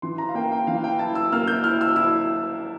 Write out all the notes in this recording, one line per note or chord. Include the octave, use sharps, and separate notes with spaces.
E3 C6
A#5
F5
A#3 G5
G5
E3 F5
G5
E4 A5
E6
A#3 F6
G6
E4 F6
E6
E4 E6